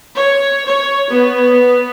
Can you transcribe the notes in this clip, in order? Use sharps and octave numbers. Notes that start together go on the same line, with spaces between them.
C#5
C#5
B3